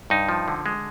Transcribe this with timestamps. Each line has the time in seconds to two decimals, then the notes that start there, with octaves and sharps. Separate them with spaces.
0.10 G2 D#4
0.29 F3
0.48 D3
0.66 G#3